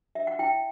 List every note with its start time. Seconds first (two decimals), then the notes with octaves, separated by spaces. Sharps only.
0.15 E5
0.27 F#5
0.39 E4 G5